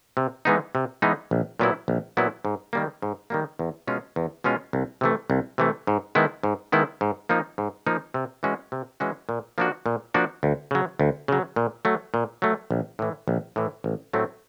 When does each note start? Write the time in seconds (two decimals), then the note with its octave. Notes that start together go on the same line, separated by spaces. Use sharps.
0.17 C3
0.45 E3 G#3 B3 D#4
0.75 C3
1.02 E3 G#3 B3 D#4
1.31 A#1
1.60 A#2 F#3 B3 E4
1.88 A#1
2.17 A#2 F#3 B3 E4
2.45 G#2
2.73 D#3 G3 A#3
3.02 G#2
3.30 D#3 G3 A#3
3.59 E2
3.87 B2 G#3 C#4 F4
4.16 E2
4.44 B2 G#3 C#4 F4
4.73 C2
5.01 C3 E3 A3
5.30 C2
5.58 C3 E3 A3
5.87 G#2
6.15 D#3 G#3 B3 E4
6.43 G#2
6.72 D#3 G#3 B3 E4
7.01 G#2
7.29 F3 A#3 D#4
7.58 G#2
7.87 F3 A#3 D#4
8.14 C3
8.43 E3 G#3 C#4 F#4
8.72 C3
9.00 E3 G#3 C#4 F#4
9.29 A#2
9.58 F3 A#3 D4 F#4
9.86 A#2
10.14 F3 A#3 D4 F#4
10.43 D2
10.71 C#3 F#3
10.99 D2
11.28 C#3 F#3
11.56 A#2
11.85 F#3 A3
12.14 A#2
12.42 F#3 A3
12.71 A#1
12.99 A2 E3
13.28 A#1
13.56 A2 E3
13.84 A1
14.13 A2 F#3 A3 C4